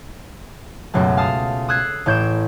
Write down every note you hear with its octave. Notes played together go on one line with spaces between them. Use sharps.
C#2 F#2 B2 F#3 A3
F5 A5 D#6
D#6 E6 F#6 G#6 C7
A1 A2 C#5 G6 D7 E7